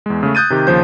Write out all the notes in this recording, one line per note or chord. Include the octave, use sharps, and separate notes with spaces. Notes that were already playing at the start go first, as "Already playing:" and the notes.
E2 G#3
C#3 A3
D#6 F#6 G6 A6 D#7
C3 D#3 G4
D#2 C#3 F3 C5 G6